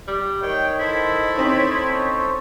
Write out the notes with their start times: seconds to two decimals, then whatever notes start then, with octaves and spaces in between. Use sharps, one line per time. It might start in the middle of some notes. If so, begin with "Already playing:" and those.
0.08 G3
0.42 D#3 C#5 G5
0.80 E4 A4 C5
1.36 C4 D#4 C#5
1.94 C#4